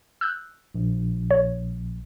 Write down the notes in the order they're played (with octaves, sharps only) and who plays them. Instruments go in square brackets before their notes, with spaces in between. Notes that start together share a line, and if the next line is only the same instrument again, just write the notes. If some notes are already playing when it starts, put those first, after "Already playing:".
[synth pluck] E6 F#6 G6
[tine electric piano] A#1
[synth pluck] C#5